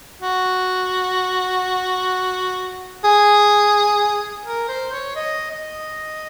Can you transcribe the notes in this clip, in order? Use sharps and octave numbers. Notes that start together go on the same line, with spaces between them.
F#4
G#4
A#4
C5
C#5
D#5
D#5